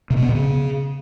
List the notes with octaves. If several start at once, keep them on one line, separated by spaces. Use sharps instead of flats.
C3
B2
B3
C3
C#3